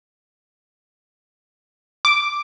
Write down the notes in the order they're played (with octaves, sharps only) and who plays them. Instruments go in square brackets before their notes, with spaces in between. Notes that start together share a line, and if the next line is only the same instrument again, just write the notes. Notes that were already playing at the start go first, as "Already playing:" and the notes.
[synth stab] D6